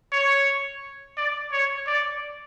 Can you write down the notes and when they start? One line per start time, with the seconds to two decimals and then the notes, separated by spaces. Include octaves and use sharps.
0.12 C#5
1.17 D5
1.52 C#5
1.87 D5